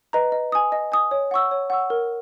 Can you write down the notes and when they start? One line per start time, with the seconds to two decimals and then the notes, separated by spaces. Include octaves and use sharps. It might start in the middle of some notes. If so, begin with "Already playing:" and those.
0.13 B4 D#5 A#5
0.32 D#5
0.52 G#5 D#6
0.72 D#5
0.92 G#5 D#6
1.11 C#5
1.31 F#5 C#6 E6
1.51 C#5
1.70 F#5 C#6 E6
1.90 A#4